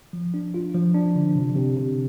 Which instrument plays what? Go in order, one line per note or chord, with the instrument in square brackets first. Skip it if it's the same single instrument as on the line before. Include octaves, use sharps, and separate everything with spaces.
[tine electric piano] F3
D4
F4
F3
D4
D3
C3
C3
C3